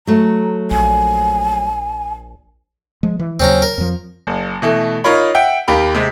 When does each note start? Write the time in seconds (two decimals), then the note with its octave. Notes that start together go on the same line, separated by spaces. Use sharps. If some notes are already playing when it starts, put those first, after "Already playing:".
0.07 F#3 A3 A#5
0.71 A#1 G#5
3.03 F3 G#3
3.19 E3
3.40 D#2 C#3 F#3 C4 C#4 A#5
3.62 A#4
3.78 F2 F3
4.27 F#1
4.62 B2 E3 A3
5.04 D#4 F4 A#4 C#5 B5
5.35 E5 F#5 G5
5.68 D#2 G4 A#4 B5
5.94 C3 G#3 C4